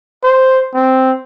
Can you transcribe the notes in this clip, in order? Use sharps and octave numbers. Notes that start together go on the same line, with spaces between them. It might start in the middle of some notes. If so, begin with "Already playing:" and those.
C5
C4